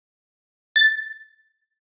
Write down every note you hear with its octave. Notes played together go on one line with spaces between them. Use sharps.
A6